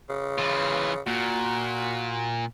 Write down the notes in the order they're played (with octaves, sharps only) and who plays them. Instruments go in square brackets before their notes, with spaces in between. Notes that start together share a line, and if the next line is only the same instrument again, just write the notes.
[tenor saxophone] C#3
[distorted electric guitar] E3 F4
[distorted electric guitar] A#2 [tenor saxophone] F#4